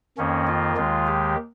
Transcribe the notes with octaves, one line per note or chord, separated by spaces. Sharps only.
F2 D#3 A#3 C#4
F4
D#2 D#3 G#3
G4